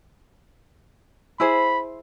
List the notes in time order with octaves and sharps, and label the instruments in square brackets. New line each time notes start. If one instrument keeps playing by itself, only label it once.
[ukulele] E4 G#4 C5 [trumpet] B5